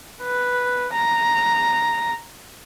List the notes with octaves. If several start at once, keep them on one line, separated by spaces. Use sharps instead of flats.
B4
A#5